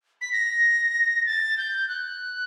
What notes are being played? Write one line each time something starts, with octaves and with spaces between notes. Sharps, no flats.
B6
A#6
A6
G6
F#6